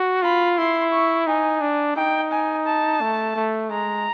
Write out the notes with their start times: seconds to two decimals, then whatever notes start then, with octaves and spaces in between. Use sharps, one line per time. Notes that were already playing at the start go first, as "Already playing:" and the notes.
Already playing: F#4
0.23 F4 B5
0.58 E4 C6
0.92 C#6
1.27 D#4 G#5
1.61 D4
1.96 D#4 G5
2.31 G#5
2.66 A5
3.01 A3
3.36 A3
3.70 G#3 A#5